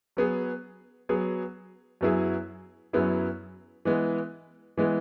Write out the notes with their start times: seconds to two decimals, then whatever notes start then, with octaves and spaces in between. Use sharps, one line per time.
0.17 F#3 B3 G#4
1.09 F#3 B3 G#4
2.01 F#2 F#3 B3 E4 G#4
2.93 F#2 F#3 B3 E4 G#4
3.85 E3 G#3 B3
4.77 E3 G#3 B3